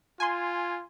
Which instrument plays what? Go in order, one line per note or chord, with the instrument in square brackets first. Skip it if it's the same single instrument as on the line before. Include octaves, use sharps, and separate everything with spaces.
[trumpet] F4 [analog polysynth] G#5 C6